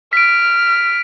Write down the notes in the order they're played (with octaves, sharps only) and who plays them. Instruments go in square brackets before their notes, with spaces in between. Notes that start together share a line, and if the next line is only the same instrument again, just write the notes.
[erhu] F6 [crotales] B6 D7